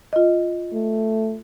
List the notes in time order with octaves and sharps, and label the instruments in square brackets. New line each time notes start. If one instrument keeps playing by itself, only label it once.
[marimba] F4 D#5
[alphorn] A3